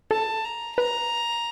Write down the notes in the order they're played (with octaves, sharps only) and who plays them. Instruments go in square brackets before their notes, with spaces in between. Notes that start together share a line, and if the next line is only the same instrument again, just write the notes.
[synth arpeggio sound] A4 [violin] A5
[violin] A#5
[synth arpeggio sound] B4 [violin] A#5